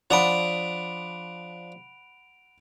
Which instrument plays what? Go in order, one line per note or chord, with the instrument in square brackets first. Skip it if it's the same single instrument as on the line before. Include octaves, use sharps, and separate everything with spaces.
[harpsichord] F3 D4 D#6 [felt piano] F#5 B5 [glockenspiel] D7 F7